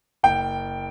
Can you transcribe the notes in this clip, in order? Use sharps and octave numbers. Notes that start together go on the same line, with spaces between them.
F#1 G5